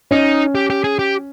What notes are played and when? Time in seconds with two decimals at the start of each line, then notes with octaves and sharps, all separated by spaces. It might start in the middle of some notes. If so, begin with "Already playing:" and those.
0.11 C#4 D#4
0.55 G4
0.70 G4
0.84 G#4
0.99 G4